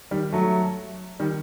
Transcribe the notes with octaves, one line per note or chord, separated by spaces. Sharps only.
D#3 G3
F#3 A3
D#3 G3